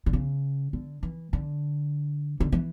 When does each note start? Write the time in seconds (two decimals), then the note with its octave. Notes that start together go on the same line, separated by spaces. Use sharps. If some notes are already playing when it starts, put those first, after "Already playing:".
0.06 D3
0.13 C#3
0.73 D3
1.03 E3
1.33 D3
2.40 D3
2.52 E3